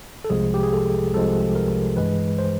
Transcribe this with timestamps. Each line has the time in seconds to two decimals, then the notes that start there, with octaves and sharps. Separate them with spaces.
0.25 A4
0.30 C2 C3 F3 G#3 G#4
0.54 G4
0.63 G#4
0.73 A4
1.14 C2 C3 F3 G#3 A4
1.55 A#4
1.97 G2 E3 G#3 B4
2.39 C5